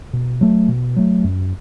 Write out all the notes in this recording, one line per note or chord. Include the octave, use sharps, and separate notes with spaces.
B2
F#3 A3
B2
F#3 A3
F#2